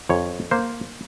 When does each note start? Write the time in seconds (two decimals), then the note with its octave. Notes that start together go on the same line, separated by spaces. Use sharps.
0.09 F2 C#5
0.51 A#3 C5